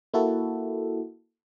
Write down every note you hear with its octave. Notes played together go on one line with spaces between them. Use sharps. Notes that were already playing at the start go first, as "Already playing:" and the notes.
A#3 E4 F#4 A4